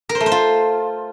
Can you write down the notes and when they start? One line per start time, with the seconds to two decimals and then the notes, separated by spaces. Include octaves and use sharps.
0.09 A#4
0.15 C5
0.20 A3
0.26 C5
0.32 F4